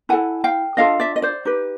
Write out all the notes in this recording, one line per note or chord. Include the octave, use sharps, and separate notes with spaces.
E4 A4 F#5 G#5
F5 G5
D4 F4 A4 D#5 F5
D5 E5
D#5
C5 D5
D#4 G4 B4